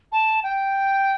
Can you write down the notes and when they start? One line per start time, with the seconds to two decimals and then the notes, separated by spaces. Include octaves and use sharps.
0.12 A5
0.43 G5